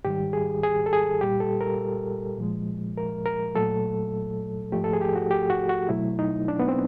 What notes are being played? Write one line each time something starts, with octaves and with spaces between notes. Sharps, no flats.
G#2 D#3 G3 G4
G#4
G#4
A4
G#4
A#2 G3 G4
A4
A#4
A#2 F3 G#3
A#4
A#4
A#2 F#3 A3 A4
G#2 F3 A3 G4
A4
G#4
G4
F#4
G4
F#4
F#4
B2 F#3 A3 E4
D#4
D4
B3
C4